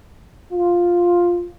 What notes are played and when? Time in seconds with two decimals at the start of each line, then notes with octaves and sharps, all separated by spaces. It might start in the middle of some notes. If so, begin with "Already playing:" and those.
0.52 F4